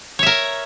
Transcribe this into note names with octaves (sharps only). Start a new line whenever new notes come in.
A#4 C#5 E5